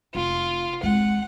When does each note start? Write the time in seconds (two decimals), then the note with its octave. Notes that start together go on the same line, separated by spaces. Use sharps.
0.15 F1 F4
0.83 G#3 C4 F#5